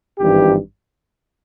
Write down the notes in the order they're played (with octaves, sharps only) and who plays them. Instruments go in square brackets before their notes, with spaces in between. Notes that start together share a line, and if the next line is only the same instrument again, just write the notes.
[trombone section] G#1 G2 E3 G4